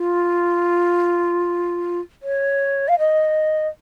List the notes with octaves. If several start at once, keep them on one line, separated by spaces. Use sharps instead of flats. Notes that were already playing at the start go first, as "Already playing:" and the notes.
Already playing: F4
C#5
F5
D#5